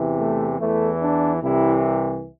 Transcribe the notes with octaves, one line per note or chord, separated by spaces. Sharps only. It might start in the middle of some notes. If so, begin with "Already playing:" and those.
Already playing: E2 C3 E3
A3
E2 E3 A3
D4
C2 C3 E3 E4